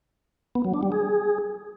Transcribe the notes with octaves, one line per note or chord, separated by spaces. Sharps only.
B3
F#3
D4
G3
G#4